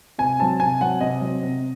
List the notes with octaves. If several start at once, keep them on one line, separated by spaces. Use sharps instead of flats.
C3 G#5
F#3 C4 A5
C3 G#5
F#3 C4 F#5
C3 D#5
F#3 C4
C3